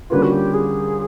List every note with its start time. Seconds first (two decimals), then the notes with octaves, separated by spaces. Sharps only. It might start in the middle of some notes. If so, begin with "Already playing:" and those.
0.10 D3 G3 A#3 C#4 F4 B4
0.23 F#4
0.32 G4
0.54 G#4